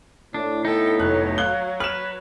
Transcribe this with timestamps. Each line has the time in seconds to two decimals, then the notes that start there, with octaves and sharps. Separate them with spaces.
0.34 A2 D4
0.65 B3 D#4 A4 G5
0.99 F1 F#3 F#6
1.38 F5 F#6 G7
1.80 B4 F6 E7